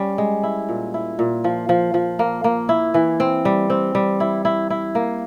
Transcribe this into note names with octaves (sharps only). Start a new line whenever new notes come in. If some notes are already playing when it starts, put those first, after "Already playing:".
Already playing: G3 C#4
G#3
E4
A#2
E4
A#2
F3
F3
F3
A#3
A#3
E4
E3
C4
G3
C4
G3
E4
E4
E4
A#3